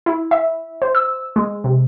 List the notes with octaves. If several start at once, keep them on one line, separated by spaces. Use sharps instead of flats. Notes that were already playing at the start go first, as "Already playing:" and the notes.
E4
E5
C5
E6
G#3
C3